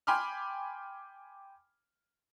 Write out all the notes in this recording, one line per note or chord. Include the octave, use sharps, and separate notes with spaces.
G5 G#5 B5 C6 D6 F6